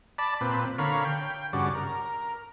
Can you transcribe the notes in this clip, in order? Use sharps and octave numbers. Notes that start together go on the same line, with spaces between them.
D5 A5 B5
A#2 C4 B4
D3 A#4 C#5 F5 B5
G5
G2 C#3 F#4 D5
A#4